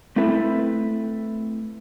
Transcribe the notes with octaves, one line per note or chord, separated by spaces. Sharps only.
A3 C4 E4 A4 B4